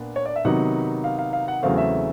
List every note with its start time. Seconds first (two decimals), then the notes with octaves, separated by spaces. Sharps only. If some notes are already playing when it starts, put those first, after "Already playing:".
Already playing: A#2 B3 D4
0.16 C#5
0.26 D5
0.36 E5
0.45 C3 D#3 F#3 B3 D#4 F#5
1.04 F5
1.19 F5
1.33 F5
1.48 F#5
1.63 E2 C#3 F#3 A3 C4 F5
1.78 E5